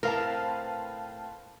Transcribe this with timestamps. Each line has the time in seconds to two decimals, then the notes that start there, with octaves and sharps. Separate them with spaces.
0.03 A2 C4 A#4 B4 F5 A5